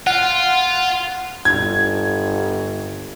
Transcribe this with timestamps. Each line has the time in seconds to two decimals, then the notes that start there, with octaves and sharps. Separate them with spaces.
0.07 F4 F#5
1.45 G1 G#6